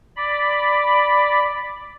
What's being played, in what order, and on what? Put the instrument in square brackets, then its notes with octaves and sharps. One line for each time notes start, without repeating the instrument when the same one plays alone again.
[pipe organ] D5 B5